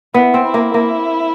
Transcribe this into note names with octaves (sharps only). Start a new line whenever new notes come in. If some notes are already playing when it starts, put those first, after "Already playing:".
B3 E4
C4
E4
A#3
A#3